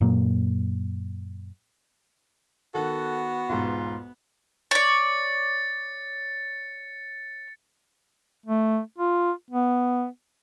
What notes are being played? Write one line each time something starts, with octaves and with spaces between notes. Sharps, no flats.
F#2 A#2 F#3 A#3
D#3 B3 F#4 A4
B1 E2 G#2 F4
C#5 D5 A6 C#7
A3
F4
B3